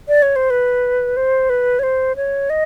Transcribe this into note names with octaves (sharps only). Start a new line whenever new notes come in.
D5
C#5
C5
B4
C5
B4
C#5
C5
C#5
D#5